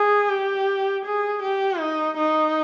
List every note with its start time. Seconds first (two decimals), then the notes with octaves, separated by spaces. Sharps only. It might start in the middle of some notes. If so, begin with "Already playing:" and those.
Already playing: G#4
0.29 G4
1.05 G#4
1.43 G4
1.80 D#4
2.17 D#4